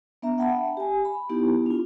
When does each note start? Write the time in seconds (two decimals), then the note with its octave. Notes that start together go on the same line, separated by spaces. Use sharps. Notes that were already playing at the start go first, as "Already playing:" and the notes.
0.22 B3 D4 E5 A#5
0.38 E5 F#5 G5 A5 B5
0.77 G4 G#5
1.05 B5
1.29 B3 D#4 E4 G4
1.66 D4 F4